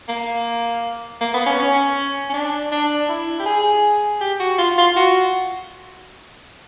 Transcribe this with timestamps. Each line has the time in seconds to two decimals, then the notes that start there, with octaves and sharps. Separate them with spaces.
0.08 A#3
1.21 A#3
1.34 B3
1.46 C#4
1.59 C#4
2.29 C#4
2.34 D4
2.72 D4
3.09 E4
3.40 G4
3.46 G#4
4.21 G4
4.39 F#4
4.58 F4
4.78 F4
4.96 F#4